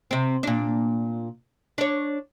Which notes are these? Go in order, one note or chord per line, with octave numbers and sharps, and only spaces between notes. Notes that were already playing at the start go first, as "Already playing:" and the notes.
C3 C4
A#2 D4
D4 C#5